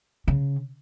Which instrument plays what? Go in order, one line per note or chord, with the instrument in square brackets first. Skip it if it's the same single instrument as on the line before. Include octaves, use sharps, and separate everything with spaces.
[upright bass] C#3